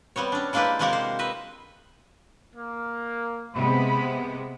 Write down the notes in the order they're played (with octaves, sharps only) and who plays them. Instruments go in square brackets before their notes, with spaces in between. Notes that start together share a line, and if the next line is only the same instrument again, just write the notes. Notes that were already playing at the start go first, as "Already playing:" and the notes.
[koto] G3 B3 C4 C#5
C#4 D4
G#3 A#3 D4 E4 G4 B4
C3 G#3 A#3 F#4 G4 A#4
C5
B4 D#5 E5
[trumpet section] A#3
[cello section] C3 G#3 B3 [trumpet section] B5